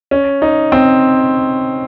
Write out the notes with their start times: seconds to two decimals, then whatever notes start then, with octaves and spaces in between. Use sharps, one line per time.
0.11 C#4
0.42 D#4
0.72 C4